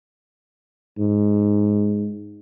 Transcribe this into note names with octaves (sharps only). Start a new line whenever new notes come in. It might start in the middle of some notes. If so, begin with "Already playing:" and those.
G#2